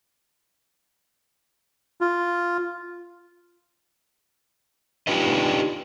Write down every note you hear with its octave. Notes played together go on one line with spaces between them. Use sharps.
F4
D4 D#4 F4 G4 B4 D#5